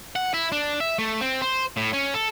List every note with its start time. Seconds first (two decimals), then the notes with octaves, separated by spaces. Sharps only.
0.16 F#5
0.34 E4
0.52 D4
0.80 E5
0.99 A3
1.21 C4
1.42 C5
1.77 A2
1.93 C#4
2.14 A4